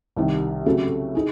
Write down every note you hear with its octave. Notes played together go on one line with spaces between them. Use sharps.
C2 C3 D#3
C#3 F#3 A3 C4 F#4
D#4 G#4